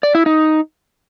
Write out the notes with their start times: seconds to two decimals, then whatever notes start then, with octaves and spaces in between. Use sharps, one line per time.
0.03 D5
0.15 E4
0.26 D#4